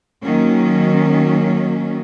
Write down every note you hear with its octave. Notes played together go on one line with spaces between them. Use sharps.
D#3 F#3 A#3 C#4